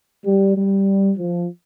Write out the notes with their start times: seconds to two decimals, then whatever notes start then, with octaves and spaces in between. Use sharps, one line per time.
0.25 G3
0.56 G3
1.18 F3